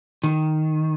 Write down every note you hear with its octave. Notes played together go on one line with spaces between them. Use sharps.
D#3